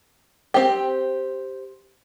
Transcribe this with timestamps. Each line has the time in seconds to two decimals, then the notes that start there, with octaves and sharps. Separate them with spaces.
0.54 C4 G4